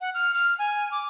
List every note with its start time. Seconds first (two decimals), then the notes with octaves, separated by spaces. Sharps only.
0.01 F#5
0.14 F6
0.35 F6
0.59 G#5
0.91 D6